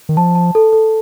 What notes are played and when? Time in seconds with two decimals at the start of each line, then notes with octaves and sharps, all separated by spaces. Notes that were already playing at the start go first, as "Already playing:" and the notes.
0.09 D#3
0.17 F3 A5
0.35 A5
0.55 A4
0.73 A4